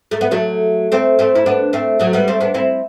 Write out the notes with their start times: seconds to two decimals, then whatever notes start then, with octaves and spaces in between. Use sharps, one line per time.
0.11 A3
0.21 B3
0.31 F#3 A3
0.92 A3 C4
1.19 A3 C4
1.35 E4
1.46 B3 D4
1.73 A3 C4
2.00 F#3 A3
2.13 G3 B3
2.28 A3 C4
2.41 B3 D4
2.54 C4 E4